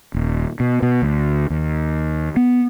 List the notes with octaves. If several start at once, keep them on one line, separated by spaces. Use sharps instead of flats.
D#1
B2
B2
D2
D#2
B3